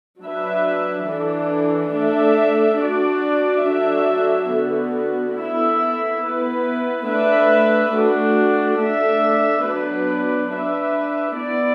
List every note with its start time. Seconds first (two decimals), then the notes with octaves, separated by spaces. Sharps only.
0.23 F#3 D4 B4 E5
1.08 E3 D4 A4
1.94 A3 D4 A4 E5
2.79 D4 F#4 D5
3.65 F#3 D4 F#4 A4 E5
4.50 D3 B3 F#4
5.36 B3 E4 A4 E5
6.22 B3 E4 B4
7.08 A3 D4 B4 E5
7.94 A3 D4 F#4
8.79 A3 D4 A4 E5
9.65 F#3 B3 D4 B4
10.50 D4 B4 E5
11.36 B3 E4 D5